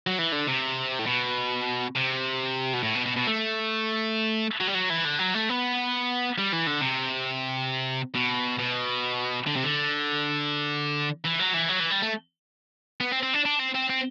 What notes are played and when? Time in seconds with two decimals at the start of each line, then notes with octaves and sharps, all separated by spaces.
0.07 F#3
0.19 E3
0.32 D3
0.47 C3
0.99 A2
1.06 B2
1.96 C3
2.74 B2
2.83 A2
2.95 B2
3.06 B2
3.16 B2
3.27 A3
4.61 F#3
4.68 G3
4.75 F#3
4.90 E3
5.05 D3
5.19 F#3
5.34 A3
5.49 B3
6.38 G3
6.52 E3
6.67 D3
6.81 C3
8.15 B2
8.59 B2
9.47 D3
9.56 C3
9.64 D3
11.24 E3
11.39 F#3
11.53 E3
11.69 F#3
11.80 E3
11.90 G3
12.02 A3
13.00 B3
13.12 C4
13.23 C4
13.34 D4
13.45 D4
13.59 C4
13.74 C4
13.89 C4